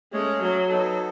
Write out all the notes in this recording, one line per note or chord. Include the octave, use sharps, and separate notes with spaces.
G#3 A3 C#4 G#4 C#5
F#3
B3 D#4 A4